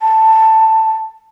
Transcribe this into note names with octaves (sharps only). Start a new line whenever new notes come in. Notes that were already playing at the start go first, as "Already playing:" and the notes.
A5